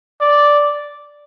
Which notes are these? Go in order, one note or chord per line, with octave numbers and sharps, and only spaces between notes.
D5